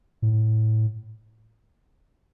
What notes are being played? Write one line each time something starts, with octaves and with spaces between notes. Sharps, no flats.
A2